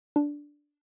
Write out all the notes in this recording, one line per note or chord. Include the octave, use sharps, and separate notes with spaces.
D4